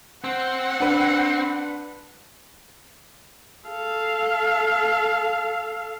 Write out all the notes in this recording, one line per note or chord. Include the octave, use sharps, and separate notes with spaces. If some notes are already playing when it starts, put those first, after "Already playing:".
C4 F#5
D4 B4
A4 F5